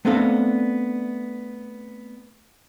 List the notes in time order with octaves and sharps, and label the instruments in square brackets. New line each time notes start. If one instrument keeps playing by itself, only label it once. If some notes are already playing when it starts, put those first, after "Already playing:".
[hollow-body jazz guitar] A3 B3 C4 D4 A4 F5